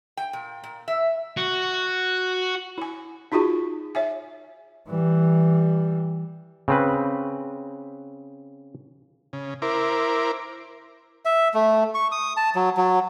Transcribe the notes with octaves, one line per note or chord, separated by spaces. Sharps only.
G5
A#2
A#2
E5
F#4
E4 G#5
D#4 F4 F#4 G#4 A5
C#5 E5 G#5
E3 G3
C#3 C4 B4
C#3
E4 A#4 C5 D6
E5
A3
C#6
D#6
A5
F#3
F#3